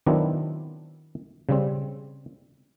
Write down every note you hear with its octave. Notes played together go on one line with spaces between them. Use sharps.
D#3 F#3 B3 C4 D4 E4
C#3 G3 C4